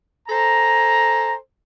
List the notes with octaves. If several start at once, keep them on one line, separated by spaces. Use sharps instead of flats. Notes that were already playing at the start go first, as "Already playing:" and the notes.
A4 C5 G#5 A#5